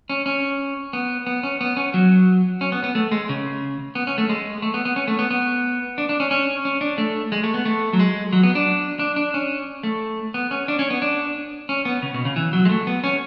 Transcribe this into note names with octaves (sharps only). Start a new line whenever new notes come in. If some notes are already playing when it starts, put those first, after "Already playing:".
C#4
C#4
B3
B3
C#4
B3
C#4
F#3
C#4
B3
B3
A3
G#3
C#3
B3
C#4
A3
G#3
A3
B3
B3
C#4
A3
B3
B3
D4
D4
C#4
C#4
C#4
D4
A3
G#3
A3
B3
A3
F#3
G#3
F#3
B3
D4
D4
D4
C#4
A3
B3
C#4
D4
C#4
B3
D4
C#4
B3
C#3
B2
C#3
E3
F#3
G#3
A3
B3
C#4